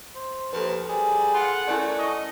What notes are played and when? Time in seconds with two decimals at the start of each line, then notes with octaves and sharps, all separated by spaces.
0.15 C5
0.53 D#2 F3 A4 B4
0.89 G3 G#4
1.34 F4 F#5
1.68 A3 C#4 E4 A#4 D5
1.99 D#5 C#6